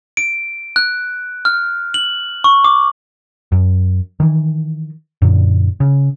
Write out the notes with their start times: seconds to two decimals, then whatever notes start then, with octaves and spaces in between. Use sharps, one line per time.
0.17 D7
0.76 F#6
1.45 F6
1.94 F#7
2.44 C#6
2.64 D6
3.52 F#2
4.20 D#3 E3
5.22 F#2 A#2 D3
5.80 C#3